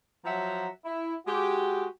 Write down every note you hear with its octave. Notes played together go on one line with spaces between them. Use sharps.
F3 F#3 E5 F#5 A#5
E4
G#3 F#4 G4